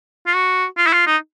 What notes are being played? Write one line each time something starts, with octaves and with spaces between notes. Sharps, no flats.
F4
F#4
F4
E4
F4
D#4